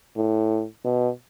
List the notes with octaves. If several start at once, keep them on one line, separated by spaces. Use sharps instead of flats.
A2
B2